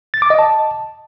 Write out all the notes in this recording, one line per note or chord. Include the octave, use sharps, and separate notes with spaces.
A6
D6
D#5
A5